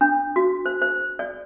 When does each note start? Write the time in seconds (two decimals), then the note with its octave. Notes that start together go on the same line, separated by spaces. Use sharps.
0.01 D4
0.36 F#4
0.66 C5
0.82 C5
1.19 D5